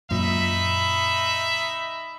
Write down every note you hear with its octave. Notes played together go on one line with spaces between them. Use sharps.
F#2 A#2 D#4 E5 B5